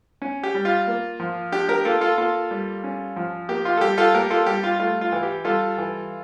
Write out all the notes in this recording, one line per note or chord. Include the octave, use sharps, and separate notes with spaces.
C#4
G4
G3
F4
A#3
F3
D4 G4
G4 A#4
A#3 F4 A4
F4 A4
A#3 F4 A4
G3
C#4
F3
A#3 G4
F4
A4
G3 G4
F4 A4
A#3 G4 A#4
F4 A4
G3 G4
F4
A3 F4
F4
E3
G4
G3 F4 A4
E3